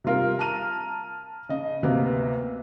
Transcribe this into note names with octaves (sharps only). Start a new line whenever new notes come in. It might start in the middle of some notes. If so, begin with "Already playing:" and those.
C3 G3 F4 A#4
A5 A#5 F6 D#7
C#3 D#5
D2 C3 A#3 B3